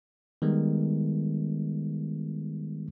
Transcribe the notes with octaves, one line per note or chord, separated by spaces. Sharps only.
D#3 G3 G#3 B3